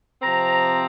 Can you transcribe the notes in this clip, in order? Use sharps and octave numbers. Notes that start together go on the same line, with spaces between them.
C3 F3 C4 A#5